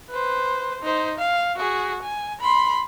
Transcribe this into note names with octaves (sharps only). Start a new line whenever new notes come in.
B4 C5
D#4 C5
F5
F#4 G#4
G#5
B5 C6